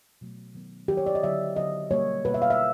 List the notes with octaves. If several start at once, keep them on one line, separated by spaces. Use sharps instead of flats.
B2 F#3 A3
D#3 F#3 B3
D#3 F#3 B3 G4
C#5
D5
D#5
D3 F#3 B3 E5
D3 F#3 B3 D#5
B2 G3 A#3 C#5
B2 G3 A#3 B4
E5
F5
E5